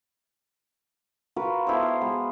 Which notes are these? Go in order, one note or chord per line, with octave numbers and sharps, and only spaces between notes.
F4 F#4 A#4 B4
B3 E4 A4 C5
F5
G#3 B3